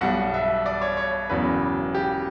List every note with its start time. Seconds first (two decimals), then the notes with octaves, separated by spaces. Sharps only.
0.01 B1 B2 G3 F#5
0.34 E5
0.66 D5
0.82 C#5
0.97 C#5
1.30 E1 E2 C#3 F#3 B4
1.94 G4